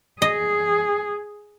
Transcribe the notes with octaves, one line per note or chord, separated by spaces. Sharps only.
G#4 D#5